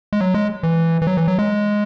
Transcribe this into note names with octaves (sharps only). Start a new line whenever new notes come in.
G#3
F#3
G#3
E3
E3
F#3
E3
F#3
G#3